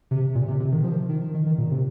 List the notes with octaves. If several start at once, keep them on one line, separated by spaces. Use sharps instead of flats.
C3
A#2
C3
C3
D#3
F3
D#3
D#3
D#3
A#2
C3